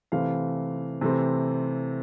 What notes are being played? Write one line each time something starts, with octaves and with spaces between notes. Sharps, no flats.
C3 E3 A3 C4 F5
C3 E3 A3 C4